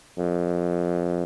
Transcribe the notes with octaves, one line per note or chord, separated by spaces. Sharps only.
F2